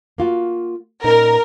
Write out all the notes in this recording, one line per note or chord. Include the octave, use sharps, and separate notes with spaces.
A#3 F4 F#4
A#2 C#4 D#4 A#4